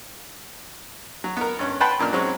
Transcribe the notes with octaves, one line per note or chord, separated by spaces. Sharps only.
F#3
B3 A#4
G2 C#4
B4 F#5 G5 A5 B5 C6
F#2 A#2 D4 F6
G#2 F#3 G#3 C4 C#4